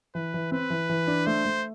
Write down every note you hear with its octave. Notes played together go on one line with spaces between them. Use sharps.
E3 B4
E3
C4 B4
E3
E3
D4
A3 C5
A3